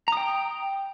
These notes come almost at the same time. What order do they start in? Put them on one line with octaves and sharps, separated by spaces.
A#5 D#6 G5